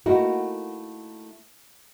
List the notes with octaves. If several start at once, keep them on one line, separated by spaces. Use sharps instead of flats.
A3 A#3 D#4 E4 F#4 A#4